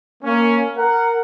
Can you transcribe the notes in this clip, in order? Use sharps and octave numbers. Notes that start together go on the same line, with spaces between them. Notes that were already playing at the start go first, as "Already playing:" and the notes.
A#3 C#4
A#4 F#5